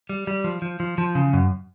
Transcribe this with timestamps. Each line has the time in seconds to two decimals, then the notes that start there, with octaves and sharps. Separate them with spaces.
0.09 G3
0.27 G3
0.44 F3
0.62 F3
0.80 F3
0.98 F3
1.15 C#3
1.33 F#2